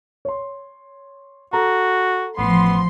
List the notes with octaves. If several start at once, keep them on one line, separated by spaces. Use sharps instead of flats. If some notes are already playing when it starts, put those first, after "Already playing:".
C#5 C6
F#4 A4 A#5
A1 F3 B3 C6